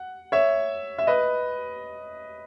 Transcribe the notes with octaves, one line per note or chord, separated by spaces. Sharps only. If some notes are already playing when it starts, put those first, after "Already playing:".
Already playing: F#5
C#5 E5
E5
B4 D#5